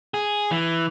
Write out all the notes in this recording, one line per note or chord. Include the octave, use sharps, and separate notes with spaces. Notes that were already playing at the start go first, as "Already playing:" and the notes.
G#4
E3